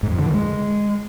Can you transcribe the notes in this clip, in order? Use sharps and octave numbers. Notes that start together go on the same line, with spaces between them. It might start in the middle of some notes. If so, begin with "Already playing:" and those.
G#2
F2
D3
E3
G#3